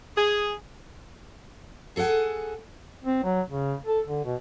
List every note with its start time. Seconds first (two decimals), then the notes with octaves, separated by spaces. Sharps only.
0.16 G#4
1.96 G#4 A4 C#5 F#5 G#5
3.04 C4
3.24 F#3
3.48 C#3
3.87 A4
4.08 D3
4.25 B2